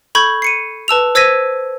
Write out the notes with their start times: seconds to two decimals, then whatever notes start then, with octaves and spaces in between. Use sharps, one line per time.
0.15 A4 B5 C#6 G6 G#6
0.42 C7 C#7 D#7
0.88 B4 A5 E6 F7
1.15 C5 E6 G#6 A#6 B6 D#7